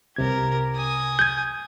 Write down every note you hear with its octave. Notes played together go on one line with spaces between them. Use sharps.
C2 C3 G4 A#4 G#6
G#5 D#6
G6 G#6